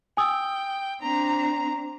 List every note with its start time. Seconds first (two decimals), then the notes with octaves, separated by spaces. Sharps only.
0.17 G5 G#5 D#6 E6
1.02 C4 D4 A#5